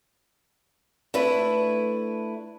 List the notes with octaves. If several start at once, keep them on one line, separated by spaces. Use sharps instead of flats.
A3 D4 E4 B4